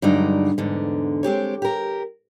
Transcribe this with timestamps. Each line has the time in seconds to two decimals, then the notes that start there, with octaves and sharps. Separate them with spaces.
0.02 G2 D3 F#3 G#3 D#4 D5
0.58 E2 G#2 D3
1.23 G#3 C4 G4 C#5
1.62 G4 A#4